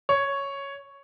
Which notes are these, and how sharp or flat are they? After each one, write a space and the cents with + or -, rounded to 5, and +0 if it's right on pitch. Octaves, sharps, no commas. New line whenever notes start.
C#5 +0